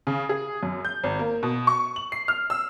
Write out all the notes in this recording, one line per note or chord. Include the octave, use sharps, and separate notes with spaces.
C#3
G#4
F#2
G6
G#1
A#3
B2
C#6
F#7
C7
F6
E6